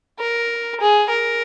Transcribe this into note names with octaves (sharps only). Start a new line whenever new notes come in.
A#4
G#4
A#4